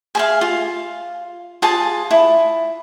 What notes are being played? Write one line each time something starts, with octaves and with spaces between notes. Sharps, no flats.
G#4 E5 F5
F4
F4 G#4 A5
E4